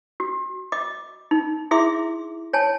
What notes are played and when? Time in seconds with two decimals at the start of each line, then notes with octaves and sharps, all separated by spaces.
0.20 F#4
0.72 D#5 D6
1.31 D#4
1.71 E4 G#4 E5 C6 D6
2.53 C#5 G#5 A5